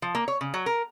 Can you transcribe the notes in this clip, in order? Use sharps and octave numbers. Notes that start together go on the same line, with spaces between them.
F3
A#3
C#5
C#3
F#3
A#4